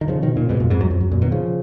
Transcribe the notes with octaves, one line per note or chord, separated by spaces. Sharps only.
D#3
C#3 F3
B2 D#3
A#2 C#3
G#2 B2
F#2 A#2
F2 G#2
F#2
F2
F#2
F#2 A#2
B2 D#3
C#3 F3